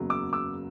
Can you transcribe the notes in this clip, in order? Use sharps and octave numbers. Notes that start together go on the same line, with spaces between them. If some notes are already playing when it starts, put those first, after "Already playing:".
Already playing: F#1 E2 C#3 F#3
D6 E6
D6 E6